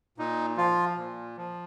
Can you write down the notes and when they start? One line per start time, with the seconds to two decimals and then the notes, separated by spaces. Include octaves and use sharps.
0.18 A#2 D#4
0.57 F3 F4
0.97 A#2
1.37 F3